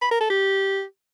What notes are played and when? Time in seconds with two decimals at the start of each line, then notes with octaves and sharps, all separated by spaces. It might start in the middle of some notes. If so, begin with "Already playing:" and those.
0.02 B5
0.11 A#4
0.21 A4
0.30 G4